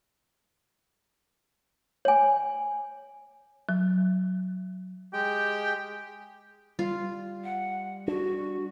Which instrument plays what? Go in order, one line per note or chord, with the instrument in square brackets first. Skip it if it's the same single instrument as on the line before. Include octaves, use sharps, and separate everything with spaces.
[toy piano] C#5 G#5
[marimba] F#3
[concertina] G#3 G5 [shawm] G4
[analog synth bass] G3 [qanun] F4
[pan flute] F#5
[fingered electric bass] D4 [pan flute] F#4